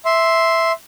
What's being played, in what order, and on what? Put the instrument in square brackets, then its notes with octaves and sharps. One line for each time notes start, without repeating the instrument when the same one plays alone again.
[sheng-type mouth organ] E5 C6